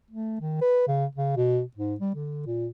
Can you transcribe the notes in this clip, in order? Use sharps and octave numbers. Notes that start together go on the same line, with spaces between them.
A3
D#3
B4
C#3
C#3
B2
G#2
G3
D3
A#2